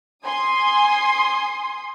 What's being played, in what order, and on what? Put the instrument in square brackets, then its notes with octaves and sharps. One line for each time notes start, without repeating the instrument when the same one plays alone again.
[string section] G#5 C6 D#6